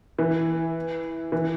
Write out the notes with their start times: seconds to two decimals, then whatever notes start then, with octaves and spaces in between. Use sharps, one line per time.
0.18 E3
1.32 E3